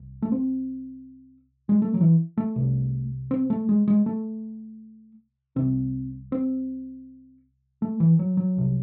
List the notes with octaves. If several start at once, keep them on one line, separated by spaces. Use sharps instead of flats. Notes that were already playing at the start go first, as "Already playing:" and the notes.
Already playing: C2
A3
C4
G#3
A3
F#3
E3
A3
C2 C3
C4
A3
G#3
G#3
A3
C2 C3 C4
C4
A3
E3
F#3
F#3
C2 C3